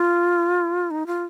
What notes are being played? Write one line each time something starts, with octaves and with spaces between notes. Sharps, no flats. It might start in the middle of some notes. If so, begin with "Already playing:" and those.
Already playing: F4
D#4
F4